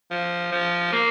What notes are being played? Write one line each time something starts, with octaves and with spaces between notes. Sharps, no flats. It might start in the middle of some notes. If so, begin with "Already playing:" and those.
F3
F3
A#3